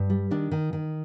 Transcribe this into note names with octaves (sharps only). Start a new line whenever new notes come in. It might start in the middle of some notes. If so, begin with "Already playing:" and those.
Already playing: G2
G3
D#3 D4
D#3
D#3